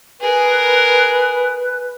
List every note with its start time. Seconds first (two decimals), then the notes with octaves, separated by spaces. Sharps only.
0.21 G#4 A#4 B4